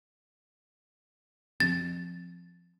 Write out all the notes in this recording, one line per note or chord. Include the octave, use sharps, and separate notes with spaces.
F3 C4 A6